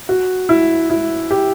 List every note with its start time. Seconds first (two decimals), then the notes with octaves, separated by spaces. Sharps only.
0.09 F#4
0.49 E4
0.90 E4
1.31 G4